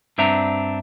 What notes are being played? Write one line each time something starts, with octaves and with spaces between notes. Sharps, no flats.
G2 C4 D4 E5 F#5 A#5